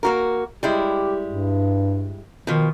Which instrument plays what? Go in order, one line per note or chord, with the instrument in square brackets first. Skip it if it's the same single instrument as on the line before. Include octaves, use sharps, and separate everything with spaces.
[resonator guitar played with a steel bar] A#3 F#4 A#4
[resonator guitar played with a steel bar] G3 G#3 E4 [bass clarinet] G4
[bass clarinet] G2
[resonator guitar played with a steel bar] B2 F3 [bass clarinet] D#3